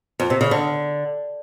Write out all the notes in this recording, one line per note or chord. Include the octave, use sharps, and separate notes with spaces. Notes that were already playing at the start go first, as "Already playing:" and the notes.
F2
C3
C#3
D3